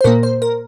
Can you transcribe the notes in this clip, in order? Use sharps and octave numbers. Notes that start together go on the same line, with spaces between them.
C5
A#2 A#3 A#4
C5
A#4